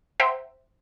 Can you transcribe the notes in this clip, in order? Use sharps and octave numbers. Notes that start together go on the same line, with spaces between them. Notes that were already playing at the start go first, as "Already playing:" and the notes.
C5 E5 F#5 G5 A#5